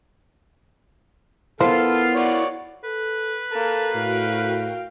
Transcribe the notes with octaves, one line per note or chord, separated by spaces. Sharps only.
B3 E4 F4 A4 A#4 C5 F5
F#4 C#5 D5
A4 B4
A#3 A4 A5
A2 F#4 A#4 F5 G5